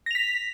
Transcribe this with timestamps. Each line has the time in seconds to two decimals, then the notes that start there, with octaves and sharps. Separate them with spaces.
0.06 A#6
0.11 F7
0.15 B6